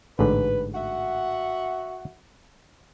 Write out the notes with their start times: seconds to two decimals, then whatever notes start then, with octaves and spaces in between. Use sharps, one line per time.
0.19 A1 G#2 D3 B4
0.74 F#4 E5 F#5